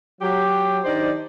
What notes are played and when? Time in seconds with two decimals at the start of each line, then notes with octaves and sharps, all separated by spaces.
0.21 F#3 G4
0.84 D#3 D4 G4 C5 D5 D#5